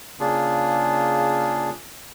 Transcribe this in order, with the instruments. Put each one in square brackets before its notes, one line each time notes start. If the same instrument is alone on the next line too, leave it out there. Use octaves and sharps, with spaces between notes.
[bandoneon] C#3 A#3 D4 F4 G#4